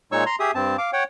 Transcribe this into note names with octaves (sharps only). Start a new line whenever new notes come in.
A#2 G#3 D#4 C#5 C#6 E6
A#5 C6
G4 G#4 E5 D#6
G2 C4 A5
F5 D6
C#5 F#5 G5